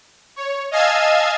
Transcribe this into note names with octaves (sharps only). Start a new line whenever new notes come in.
C#5
D#5 F5 G#5 A5 E6 G#6